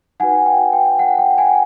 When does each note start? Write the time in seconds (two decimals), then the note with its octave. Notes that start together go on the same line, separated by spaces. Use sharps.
0.20 D#4 F#4 B4 F#5 G#5
0.46 G5
0.73 G5
0.99 F#5
1.18 G5
1.38 F#5 G#5